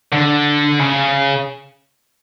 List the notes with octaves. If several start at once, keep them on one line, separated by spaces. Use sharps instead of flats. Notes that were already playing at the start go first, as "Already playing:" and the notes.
D3
C#3